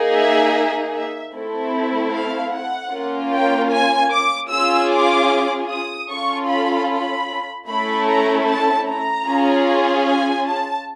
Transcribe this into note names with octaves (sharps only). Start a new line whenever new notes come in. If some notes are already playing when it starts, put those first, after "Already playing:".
Already playing: A#3 D#4 G#4
E5
E5
A3 C4 E4 A4
F5
F#5
A#3 C#4 F4
G5
G#5
D6
C#4 F4 G#4 E6
D6
D#6
C#4 F4 A4 C#6
B5
B5
A3 C#4 E4 A4 B5
A#5
A5
A#5
C#4 F4 G#4
G#5
A5